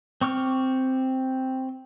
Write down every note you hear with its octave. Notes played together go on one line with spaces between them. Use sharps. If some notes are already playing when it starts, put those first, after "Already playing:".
C4 C#6 D6 F6